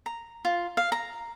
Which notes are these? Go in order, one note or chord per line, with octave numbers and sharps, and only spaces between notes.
A#5
F4
F5
A#5